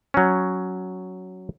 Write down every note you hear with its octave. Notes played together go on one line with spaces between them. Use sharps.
F#3 C#4